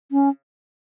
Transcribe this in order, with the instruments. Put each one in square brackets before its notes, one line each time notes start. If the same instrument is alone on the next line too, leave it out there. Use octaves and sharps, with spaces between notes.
[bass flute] C#4